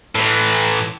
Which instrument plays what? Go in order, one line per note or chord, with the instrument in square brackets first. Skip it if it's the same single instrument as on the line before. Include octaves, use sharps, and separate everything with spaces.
[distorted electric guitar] A2 E3